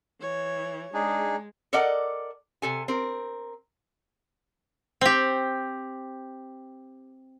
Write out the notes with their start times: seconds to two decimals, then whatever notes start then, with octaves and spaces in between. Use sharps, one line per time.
0.21 E3 C#5
0.94 G#3 D4 D#4 G#4
1.73 A4 A#4 D5 D#5 F#5
2.62 C3 A4 G#5
2.88 C4 A#4
5.01 C4 G4